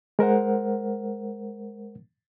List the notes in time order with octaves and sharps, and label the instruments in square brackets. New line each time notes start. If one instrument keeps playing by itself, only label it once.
[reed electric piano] G#3 A#4 C5 F#5